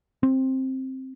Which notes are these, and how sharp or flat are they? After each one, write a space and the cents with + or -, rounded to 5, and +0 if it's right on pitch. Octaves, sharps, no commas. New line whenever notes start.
C4 +10